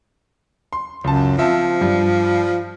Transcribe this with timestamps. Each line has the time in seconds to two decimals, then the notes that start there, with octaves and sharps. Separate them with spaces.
0.73 C6
1.04 C#2 F#2 A5
1.38 F3 C4 E5 A5
1.81 G2